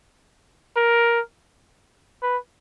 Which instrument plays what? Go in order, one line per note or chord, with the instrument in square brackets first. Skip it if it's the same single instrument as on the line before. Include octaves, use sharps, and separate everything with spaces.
[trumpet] A#4
B4